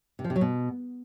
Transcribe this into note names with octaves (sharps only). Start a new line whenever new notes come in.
C3
F3
C3
F#3
B2